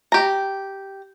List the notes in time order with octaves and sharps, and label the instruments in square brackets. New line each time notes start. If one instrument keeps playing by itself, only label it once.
[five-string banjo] G4 A#5